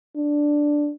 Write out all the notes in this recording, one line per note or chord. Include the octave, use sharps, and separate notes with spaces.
D4